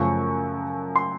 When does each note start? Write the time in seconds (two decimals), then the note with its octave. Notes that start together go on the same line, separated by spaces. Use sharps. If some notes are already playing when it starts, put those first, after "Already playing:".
Already playing: F#2 C#3 F3 A3 C#4 C#6
0.96 C6